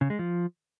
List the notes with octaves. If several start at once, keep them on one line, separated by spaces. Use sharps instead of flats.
C#3
G#3
F3